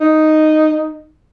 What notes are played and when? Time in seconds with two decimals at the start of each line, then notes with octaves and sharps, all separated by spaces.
0.01 D#4